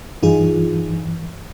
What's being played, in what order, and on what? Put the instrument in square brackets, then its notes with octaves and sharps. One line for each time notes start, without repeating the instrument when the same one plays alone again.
[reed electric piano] G2 E3 [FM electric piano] D#4 F4 G#4